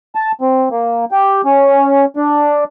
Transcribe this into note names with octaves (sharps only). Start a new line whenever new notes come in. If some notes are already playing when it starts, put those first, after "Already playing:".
A5
C4
A#3
G4
C#4
D4